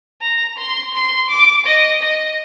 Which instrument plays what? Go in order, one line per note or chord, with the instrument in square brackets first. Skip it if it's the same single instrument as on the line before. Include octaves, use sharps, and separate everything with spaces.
[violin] A#5
C6
C6
D6
D#5
D#5